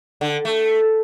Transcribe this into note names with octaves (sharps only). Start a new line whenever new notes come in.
D3
A3